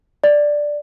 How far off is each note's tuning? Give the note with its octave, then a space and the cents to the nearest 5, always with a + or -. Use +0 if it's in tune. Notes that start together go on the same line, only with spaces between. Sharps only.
D5 +0